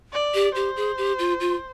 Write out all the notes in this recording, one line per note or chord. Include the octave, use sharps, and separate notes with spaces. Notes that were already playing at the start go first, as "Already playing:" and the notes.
D5
G4
G4 C5
G#4
G4
F4
F4